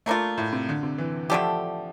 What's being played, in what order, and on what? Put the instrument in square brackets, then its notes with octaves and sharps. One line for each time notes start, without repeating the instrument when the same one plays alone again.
[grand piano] A3 [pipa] A#3 D4 F4
[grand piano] A2
C3
D3
C3
E3
[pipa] D3 A3 D4 G4 [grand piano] F3